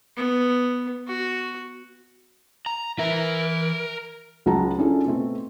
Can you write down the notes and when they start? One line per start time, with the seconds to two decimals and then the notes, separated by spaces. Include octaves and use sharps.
0.17 B3
1.07 F#4
2.66 A#5
2.99 E3 A#4 B4 E5
4.46 C#2 F#3 F#5 A5 A#5
4.78 C#4 D4 E4 F4 G#4 A4
5.06 B2 A3 C4